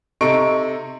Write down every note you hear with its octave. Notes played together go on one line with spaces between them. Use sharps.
C3 D#4 A4 C#6 D7